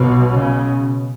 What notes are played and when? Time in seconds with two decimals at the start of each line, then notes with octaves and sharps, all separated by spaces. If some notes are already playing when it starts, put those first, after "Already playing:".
Already playing: B1 B2
0.31 C#3